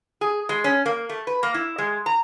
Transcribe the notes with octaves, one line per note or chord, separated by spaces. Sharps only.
G#4
G#3
C#4
A#3
A3
B4
A#3
E4
G#3
A#5